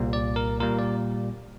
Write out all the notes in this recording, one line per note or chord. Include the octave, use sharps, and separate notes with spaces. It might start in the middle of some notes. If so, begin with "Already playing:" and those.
Already playing: C2 A#2 G3 A#3
D5
A#4
A#2 G3 A#3 A#4
D5